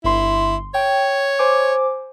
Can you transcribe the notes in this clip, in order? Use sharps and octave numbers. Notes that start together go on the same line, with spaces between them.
G1 E4 C6
C#5 G5
C5 G#5 D6